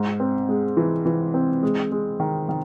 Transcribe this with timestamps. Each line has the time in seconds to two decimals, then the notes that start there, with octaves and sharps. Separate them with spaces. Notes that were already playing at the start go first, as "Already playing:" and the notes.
Already playing: G#2
0.20 C4
0.49 G#3
0.77 E3
1.05 E3
1.34 C4
1.63 G#3
1.92 G#3
2.20 D#3
2.49 D#3